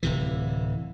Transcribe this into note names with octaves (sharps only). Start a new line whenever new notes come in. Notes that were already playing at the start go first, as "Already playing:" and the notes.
D1 C3 E3